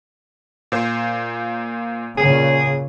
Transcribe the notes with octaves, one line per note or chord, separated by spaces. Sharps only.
A#2 C5
A#2 C#3 G#4